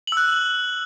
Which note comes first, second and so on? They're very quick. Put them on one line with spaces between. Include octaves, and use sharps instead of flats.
F#7 E6 F#6